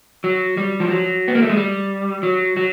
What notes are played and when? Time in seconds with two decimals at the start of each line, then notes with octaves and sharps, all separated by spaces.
0.24 F#3
0.57 G3
0.80 F3
0.90 F#3
1.28 B3
1.35 A#3
1.42 A3
1.50 G#3
1.57 G3
2.23 F#3
2.57 F#3